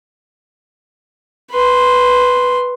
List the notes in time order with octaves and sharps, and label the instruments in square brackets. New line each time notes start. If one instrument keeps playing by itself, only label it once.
[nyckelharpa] B4 C6